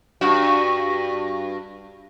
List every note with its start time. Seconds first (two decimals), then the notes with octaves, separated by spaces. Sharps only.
0.21 G2 F#4